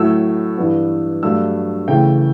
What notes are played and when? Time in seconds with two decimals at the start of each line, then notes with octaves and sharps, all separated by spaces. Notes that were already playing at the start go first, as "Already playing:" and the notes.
Already playing: A2 F#3 A3 E6
0.58 G2 E3 B3
1.23 G2 F#3 A3 E6
1.88 C#3 E3 A3 G5